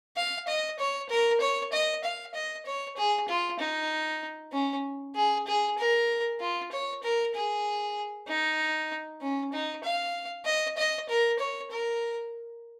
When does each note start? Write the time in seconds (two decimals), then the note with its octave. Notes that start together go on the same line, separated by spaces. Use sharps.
0.17 F5
0.48 D#5
0.79 C#5
1.10 A#4
1.41 C#5
1.73 D#5
2.04 F5
2.34 D#5
2.66 C#5
2.97 G#4
3.28 F4
3.59 D#4
4.53 C#4
5.16 G#4
5.47 G#4
5.79 A#4
6.40 F4
6.72 C#5
7.03 A#4
7.34 G#4
8.28 D#4
9.21 C#4
9.53 D#4
9.84 F5
10.46 D#5
10.77 D#5
11.09 A#4
11.39 C#5
11.71 A#4